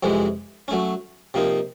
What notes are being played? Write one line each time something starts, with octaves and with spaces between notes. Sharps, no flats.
F2 C3 E3 G#3
F#3 A3 C#4
C3 F3 A#3 D#4